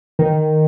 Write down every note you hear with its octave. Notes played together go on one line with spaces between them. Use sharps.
D#3